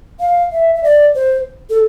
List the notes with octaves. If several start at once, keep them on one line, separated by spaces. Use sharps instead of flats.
F5
E5
E5
D5
C5
A4